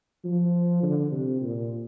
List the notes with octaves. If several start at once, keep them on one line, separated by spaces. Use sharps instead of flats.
F3
D3
C3
A#2